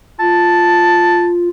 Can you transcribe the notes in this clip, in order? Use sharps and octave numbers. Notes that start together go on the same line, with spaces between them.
F4 A5